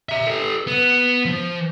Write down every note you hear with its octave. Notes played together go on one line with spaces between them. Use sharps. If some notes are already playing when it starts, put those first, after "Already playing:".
E5 A#5
G4 A4
B3
F3